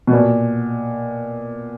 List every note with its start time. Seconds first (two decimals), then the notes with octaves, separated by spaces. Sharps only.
0.07 B2
0.12 A#2